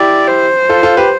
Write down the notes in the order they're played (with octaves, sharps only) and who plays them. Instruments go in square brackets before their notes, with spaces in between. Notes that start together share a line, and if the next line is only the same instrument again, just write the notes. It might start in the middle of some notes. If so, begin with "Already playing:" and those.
Already playing: [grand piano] E4 G4 [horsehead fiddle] D5
[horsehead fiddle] C5
[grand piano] F4 A4
F4 A4
G4 B4